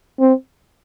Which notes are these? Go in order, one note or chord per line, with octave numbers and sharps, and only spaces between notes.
C4